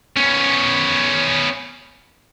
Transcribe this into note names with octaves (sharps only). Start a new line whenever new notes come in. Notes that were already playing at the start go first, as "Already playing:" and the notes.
B3 C#4